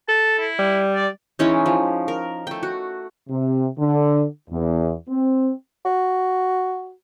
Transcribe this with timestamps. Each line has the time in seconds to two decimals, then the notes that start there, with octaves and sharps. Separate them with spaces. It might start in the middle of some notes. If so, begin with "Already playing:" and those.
0.09 A4 A5
0.39 E4
0.59 G3
0.95 D5
1.39 E3 G#3 C#4 D#4
1.66 F3
2.08 A#4
2.47 A3 G5
2.63 F#4
3.28 C3
3.78 D3
4.50 E2
5.08 C4
5.86 F#4